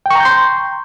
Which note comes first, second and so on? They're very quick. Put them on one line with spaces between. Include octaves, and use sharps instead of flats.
G5 C#6 A#5 G6 C6